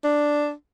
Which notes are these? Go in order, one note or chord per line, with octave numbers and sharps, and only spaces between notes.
D4